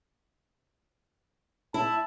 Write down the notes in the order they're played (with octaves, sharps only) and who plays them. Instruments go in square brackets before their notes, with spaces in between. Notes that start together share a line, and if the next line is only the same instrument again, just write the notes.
[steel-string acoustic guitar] E4 [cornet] A5